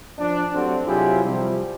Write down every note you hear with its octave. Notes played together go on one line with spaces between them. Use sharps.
F3 D4
F#3 A3 C4 D4 F#4 G4
C3 F#3 E4 F4 G4 G#4
C3 F3 G3